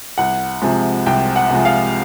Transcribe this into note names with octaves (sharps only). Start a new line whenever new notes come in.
C2 F#5
C3 F3 G#3
C2 G5
F#5
C3 F3 G#3
F5